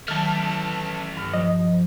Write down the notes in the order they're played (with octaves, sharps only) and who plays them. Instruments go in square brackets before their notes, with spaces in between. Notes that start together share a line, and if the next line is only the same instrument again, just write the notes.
[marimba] D#3 F#3 [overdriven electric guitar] E3 A3 [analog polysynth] A5 F6
[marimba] G2 F6
[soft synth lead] F3 [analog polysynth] D#5